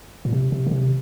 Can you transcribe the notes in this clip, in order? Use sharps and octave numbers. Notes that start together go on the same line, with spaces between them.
A#2
C3
C3
D3
C3